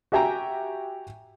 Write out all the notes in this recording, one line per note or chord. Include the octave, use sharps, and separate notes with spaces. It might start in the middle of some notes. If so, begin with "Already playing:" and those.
F#4 G4 E5 G5 G#5 A#5